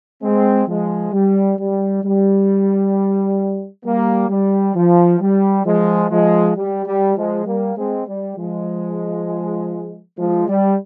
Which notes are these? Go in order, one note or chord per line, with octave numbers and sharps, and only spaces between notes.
G#3 C4
F3 G#3
G3
G3
G3
G3 A#3
G3
F3
G3
F3 G#3
F3 G#3
G3
G3
F3 G#3
G3 A#3
G#3 C4
G3
F3 G#3
F3 G#3
G3